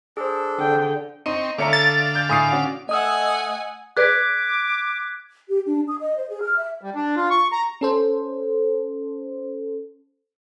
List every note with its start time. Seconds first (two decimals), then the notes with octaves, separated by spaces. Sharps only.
0.17 D4 G#4 A4 C5
0.59 D3 G5
1.26 C4 D#4 C#6 D#7
1.58 D3 A3 C#5 E5 F5 A#5 D6 C#7
1.73 A6
2.15 G6
2.29 A2 G#5 D#6 C7
2.52 C#4 F#4
2.89 A3 D#5 F#5 G#5 D#6 E6
3.97 G#4 B4 D5 D6 F#6 G#6 B6
5.48 G4
5.66 D4
5.87 D#6
5.99 D#5
6.15 C5
6.28 G#4
6.41 F6
6.56 E5
6.81 G3
6.95 D4
7.16 F4
7.30 C#6
7.52 A#5
7.81 C#4 A4 C5